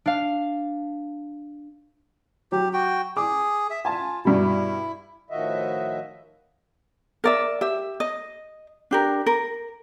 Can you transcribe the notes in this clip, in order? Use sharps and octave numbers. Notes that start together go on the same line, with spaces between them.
D4 F5
F#3 G4
F#4 G5
G#4 D6
E5
F4 G#5 A5
G2 B2 E4
A2 D#3 F3 F#4 D#5 E5
A#4 D5 E5
G4 E5
D#5
D4 G4 A#4
A#4